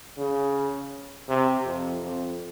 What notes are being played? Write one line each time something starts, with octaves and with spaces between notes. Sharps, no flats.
C#3
C3
F2
F2